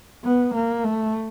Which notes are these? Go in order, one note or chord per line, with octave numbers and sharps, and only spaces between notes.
B3
A#3
A3